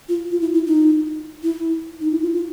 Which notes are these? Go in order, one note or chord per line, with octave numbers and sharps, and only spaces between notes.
F4
F4
E4
E4
D#4
E4
D#4
E4
F4
F4